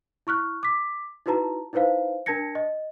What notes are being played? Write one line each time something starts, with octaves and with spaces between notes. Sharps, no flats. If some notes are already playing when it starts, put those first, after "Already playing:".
E4 C#6 F6 F#6
D6 B6
D#4 E4 F#4 B4 A5 A#5
D#4 E4 B4 C5 F5
D4 A#4 A5 G#6 A#6 C#7
D#5